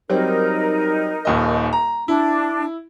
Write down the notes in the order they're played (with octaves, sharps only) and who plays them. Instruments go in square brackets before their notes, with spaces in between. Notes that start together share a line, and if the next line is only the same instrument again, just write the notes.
[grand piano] F#3 G3 C4 [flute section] D#4 A#4
[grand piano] D#1 D#2 D#5
A#5
[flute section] D4 [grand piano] E4